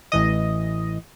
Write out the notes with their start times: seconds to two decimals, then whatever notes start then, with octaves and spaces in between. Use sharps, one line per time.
0.12 A1 E3 D#5